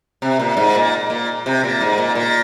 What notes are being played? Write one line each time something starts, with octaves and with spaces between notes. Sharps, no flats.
C3
A#2
G#2
A#2
A#2
C3
A#2
G#2
A#2
A#2